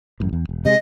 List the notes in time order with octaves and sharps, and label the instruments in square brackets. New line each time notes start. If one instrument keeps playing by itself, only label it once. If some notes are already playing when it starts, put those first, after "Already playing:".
[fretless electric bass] A1 F#2 A#2
E2
E1
[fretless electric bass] C3 G#3 [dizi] D#5